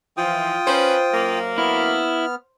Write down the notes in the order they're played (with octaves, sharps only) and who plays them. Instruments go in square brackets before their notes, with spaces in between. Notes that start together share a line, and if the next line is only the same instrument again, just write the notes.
[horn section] E3 F3 [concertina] F4 G5 D#6
[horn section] C#4 B4 [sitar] C5
[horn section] F#2 A#3
[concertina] B3 F6 [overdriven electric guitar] E4